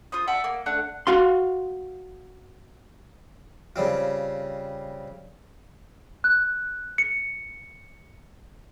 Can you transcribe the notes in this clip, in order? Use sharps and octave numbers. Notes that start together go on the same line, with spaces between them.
F4 C5 D#6
D5 E5 F#5 A5
A#3
A3 D4 F#5
F#4 F5 C6
C#3 G3 C4 F4
F#6
C#7